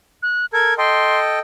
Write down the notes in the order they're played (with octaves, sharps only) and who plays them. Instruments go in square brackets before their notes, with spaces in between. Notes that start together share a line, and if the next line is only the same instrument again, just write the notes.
[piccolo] F#6
[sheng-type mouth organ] A4 A#4 [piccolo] G#6
[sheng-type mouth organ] A4 D#5 G5 [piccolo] C6